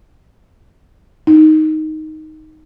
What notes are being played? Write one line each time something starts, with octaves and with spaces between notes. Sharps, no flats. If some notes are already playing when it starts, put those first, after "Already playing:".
D#4